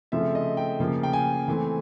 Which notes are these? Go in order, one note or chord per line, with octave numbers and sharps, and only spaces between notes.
C#3 F3 A3 C4 E5
D#5
G5
C#3 F3 A#3
G5
G#5
E3 A3 C4